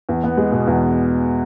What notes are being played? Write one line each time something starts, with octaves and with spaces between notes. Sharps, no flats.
E2
B3
G#3
B2
E2